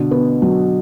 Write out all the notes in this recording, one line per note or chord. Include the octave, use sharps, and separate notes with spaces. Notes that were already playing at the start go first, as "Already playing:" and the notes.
Already playing: B2 D3
B3
F#3